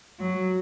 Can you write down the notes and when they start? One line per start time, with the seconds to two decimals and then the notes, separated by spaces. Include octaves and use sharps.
0.20 F#3